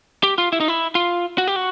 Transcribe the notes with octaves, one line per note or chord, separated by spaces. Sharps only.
G4
F4
E4
D#4
E4
F4
F#4
G4
F#4